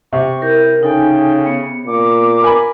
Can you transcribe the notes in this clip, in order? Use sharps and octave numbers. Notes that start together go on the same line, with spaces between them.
C3 C#6
E4 A#4 G6
C#3 D#4 A4 G5 G#5
B3 C#7
A#2 D6
A#4 G#5 B5